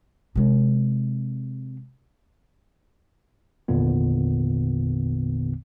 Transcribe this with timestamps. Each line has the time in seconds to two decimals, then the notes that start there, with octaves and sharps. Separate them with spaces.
0.35 C3 G#3
3.68 G#1 E2 A#2 D3 B3